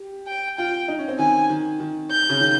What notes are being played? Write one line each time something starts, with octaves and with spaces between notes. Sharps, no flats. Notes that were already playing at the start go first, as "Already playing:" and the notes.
Already playing: G4
G5
F4 G5
D#4
C#4
C4
D#3 G#5
D#3
D#3
G6
C#3
D#3